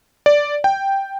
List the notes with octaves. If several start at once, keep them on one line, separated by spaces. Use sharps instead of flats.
D5
G5